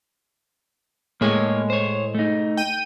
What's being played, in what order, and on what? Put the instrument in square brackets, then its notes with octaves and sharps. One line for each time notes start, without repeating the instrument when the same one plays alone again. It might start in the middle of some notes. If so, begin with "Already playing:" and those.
[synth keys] A2 G#3 [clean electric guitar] A#3 C#5
[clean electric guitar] C5 C#5
A3 D#4
[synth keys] G5 D#7